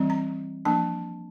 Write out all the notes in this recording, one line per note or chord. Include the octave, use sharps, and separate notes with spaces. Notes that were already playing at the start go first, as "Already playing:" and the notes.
Already playing: E3 G3 C4
A#5
F3 A#3 D4 A5